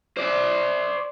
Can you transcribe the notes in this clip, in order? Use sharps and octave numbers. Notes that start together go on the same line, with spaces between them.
C5 D5